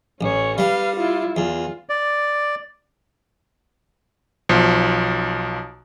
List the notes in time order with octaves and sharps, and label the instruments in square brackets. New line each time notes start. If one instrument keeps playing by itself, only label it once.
[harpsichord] A1 [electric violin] C#4 C#5
[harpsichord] G3 [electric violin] B4 F5
[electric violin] E4 F4
[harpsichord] E2 [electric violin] F4
[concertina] D5
[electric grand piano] B1 F3